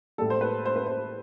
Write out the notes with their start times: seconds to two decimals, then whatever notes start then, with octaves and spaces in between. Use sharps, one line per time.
0.18 A2 G3 A4
0.30 C5
0.41 B4
0.66 C5
0.76 B4
0.87 C5